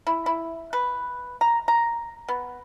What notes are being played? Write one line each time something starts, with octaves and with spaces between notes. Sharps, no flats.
E4
E4
B4
A#5
A#5
B3